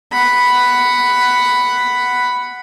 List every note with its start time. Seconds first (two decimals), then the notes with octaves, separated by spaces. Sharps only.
0.12 F#5 B5